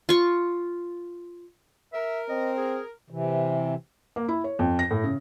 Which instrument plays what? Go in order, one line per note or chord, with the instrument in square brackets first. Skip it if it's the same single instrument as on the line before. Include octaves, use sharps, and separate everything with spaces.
[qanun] F4 C#6
[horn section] A#4 [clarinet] E5
[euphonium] C4 [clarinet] D#5
[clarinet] G#4
[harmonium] C3 E3
[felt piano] A#3
E4
C#5
F2
A#6
A2
C#3